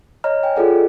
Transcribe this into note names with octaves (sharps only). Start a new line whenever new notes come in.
C#5 D#5 A#5 F6
G5 G#5
F4 G#4 A4 D5 F#5